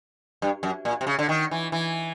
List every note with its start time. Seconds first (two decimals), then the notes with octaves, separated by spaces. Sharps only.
0.42 G2
0.63 F#2
0.85 A#2
1.01 C3
1.07 C#3
1.19 D3
1.29 D#3
1.51 E3
1.72 E3